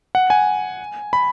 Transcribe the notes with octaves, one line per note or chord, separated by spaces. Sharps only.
F#5
G#5
B5